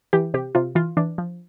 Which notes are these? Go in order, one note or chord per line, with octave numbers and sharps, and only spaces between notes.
E3 G4
C3 G4
C3 F4
E3 F4
E3 D4
F3